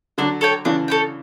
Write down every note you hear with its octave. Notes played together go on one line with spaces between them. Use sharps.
D3 F#3 D4
A4 C#5 G5
C#3 E3 D4
A4 C#5 G5